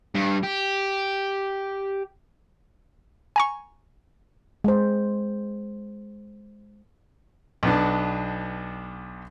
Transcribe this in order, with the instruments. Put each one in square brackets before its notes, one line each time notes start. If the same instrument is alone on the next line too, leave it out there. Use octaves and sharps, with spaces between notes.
[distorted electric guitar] G2
G4
[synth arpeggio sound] G#5 A#5 C#6
[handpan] G#3 C5
[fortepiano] B1 B3 D4